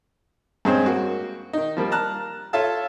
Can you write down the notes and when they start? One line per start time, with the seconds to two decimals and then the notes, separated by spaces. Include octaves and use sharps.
0.65 G2 G#3 C4 C#4
0.86 A#3 F#4
1.53 D#3 D#4
1.77 F3 G3 A#3
1.92 A5 A#5 F6 F#6
2.53 F4 A4 C#5 E5 F5 A5